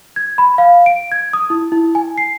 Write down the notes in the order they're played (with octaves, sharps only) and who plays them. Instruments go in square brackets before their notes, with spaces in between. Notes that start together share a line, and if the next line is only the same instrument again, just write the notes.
[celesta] G#6
B5
F5
D7
G#6
D#6
E4
E4
G#5
C7